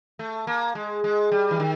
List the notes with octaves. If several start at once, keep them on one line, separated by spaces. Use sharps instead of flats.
A3
A#3
G#3
G#3
G3
E3
D#3